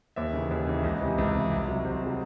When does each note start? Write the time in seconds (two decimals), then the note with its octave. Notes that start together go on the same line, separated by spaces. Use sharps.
0.16 D#2 E5
0.33 C#3 E3
0.51 D#2
0.67 C#3 E3
0.83 C#2 D#5
1.01 C3 E3
1.18 C#2
1.35 C3 E3
1.51 C2
1.68 C3 F#3
1.84 C2 C5
2.02 C3 F#3 G#4